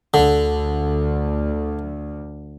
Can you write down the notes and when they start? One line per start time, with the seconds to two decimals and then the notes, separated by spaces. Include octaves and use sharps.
0.14 D2 D3